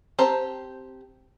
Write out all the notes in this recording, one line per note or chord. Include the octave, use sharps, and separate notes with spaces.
C4 G4 C5 A5 A#5